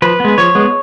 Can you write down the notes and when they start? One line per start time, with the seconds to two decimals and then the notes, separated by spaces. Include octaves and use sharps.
0.02 F3 B4
0.20 G#3 B3
0.38 F3 C#5
0.55 G#3 B3